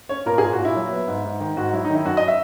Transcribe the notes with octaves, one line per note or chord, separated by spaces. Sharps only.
C#4 C#5
A#2 A#4
G#4
A#2 A#4
F#4
A#2
E4
F#3
B3
G#2
G#2
D#3
G#2 F#4
F#3 E4
D#4
D#3
E4
F#2 F#4
D#5
E5